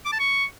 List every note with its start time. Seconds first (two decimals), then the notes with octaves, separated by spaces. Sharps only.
0.05 D6
0.12 A5
0.20 C#6